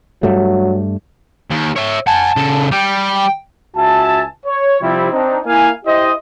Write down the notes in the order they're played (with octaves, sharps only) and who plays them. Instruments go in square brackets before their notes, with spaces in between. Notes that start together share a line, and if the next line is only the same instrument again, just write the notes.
[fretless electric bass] G2 G3 A3 [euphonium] F#3
[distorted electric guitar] D#2
C#5 E5
[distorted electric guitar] F#5 G#5 [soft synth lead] A5
[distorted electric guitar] C#3 A4
[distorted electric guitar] G3 [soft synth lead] G5
[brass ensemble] C#2 F#4 E5 G#5 A5
C#5
C3 F3 G3 C4 E4
C4 D4 D#4
A#3 E4 F5 G#5
E4 G4 C5 D#5